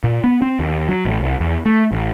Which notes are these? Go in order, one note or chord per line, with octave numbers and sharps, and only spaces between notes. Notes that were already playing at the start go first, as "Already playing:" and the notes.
A#2
B3
C4
D#2
F#3
A1
C2
E2
A3
A1